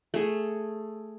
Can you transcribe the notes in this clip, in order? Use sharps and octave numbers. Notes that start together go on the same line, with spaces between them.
A3 G#4